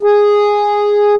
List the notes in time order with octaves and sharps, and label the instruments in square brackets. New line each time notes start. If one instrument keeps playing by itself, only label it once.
[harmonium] G#4